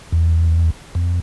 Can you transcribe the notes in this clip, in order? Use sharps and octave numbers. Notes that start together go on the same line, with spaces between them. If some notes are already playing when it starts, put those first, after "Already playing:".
E2
F2